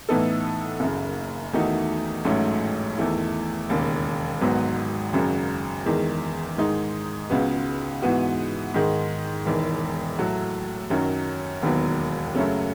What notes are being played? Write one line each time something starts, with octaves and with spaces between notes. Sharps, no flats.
A2 E3 B3 D#4 A4
F#1 F#2 C#3
E2 D#3 A3 D#4 F#4
A1 G#2 F#3 A3 C#4
E2 D#3 A3 E4
E1 D#2 C#3
G#1 G#2 F#3 B3
G#1 F#2 C#3 F#3
E2 D#3 G#3
G#2 D#3 G#3 D#4
C#2 C#3 G#3 B3 F#4
G#2 E3 B3 F#4
G#2 D#3 G#3
E1 E2 D#3
A2 F#3 A3
F#2 D#3 F#3 C#4
E1 D#2 D#3 F#3 B3
F#2 C#3 F#3 A3 C#4